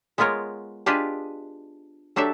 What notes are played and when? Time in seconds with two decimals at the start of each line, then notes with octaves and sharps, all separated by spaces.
0.18 G#3 B3 F4 A#4 C#5
0.86 D4 F4 G4 G#4 B4 D#5
2.16 F#3 D4 G4 A4 E5